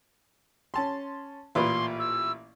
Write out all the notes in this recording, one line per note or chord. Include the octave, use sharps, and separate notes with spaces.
C#4 A5 C6
A1 A#2 B4 C6
E6